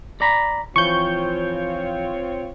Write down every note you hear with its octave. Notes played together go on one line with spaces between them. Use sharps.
D5 A#5 B5
E3 F3 C4 F4 C#5 C#6 G6